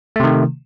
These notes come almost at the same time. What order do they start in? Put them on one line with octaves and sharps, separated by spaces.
A3 C3 D#3